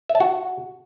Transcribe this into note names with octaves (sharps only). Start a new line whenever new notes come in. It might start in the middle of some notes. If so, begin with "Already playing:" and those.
E5
A5
F#4